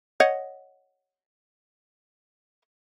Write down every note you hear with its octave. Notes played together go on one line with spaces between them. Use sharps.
C#5 D#5 F#5